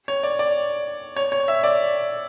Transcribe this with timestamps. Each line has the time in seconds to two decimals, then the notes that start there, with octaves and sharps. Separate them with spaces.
0.08 C#5
0.23 D5
0.39 D5
1.16 C#5
1.32 C#5
1.48 E5
1.64 D5